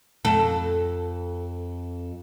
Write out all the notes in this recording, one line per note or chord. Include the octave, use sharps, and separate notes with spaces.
F2 A4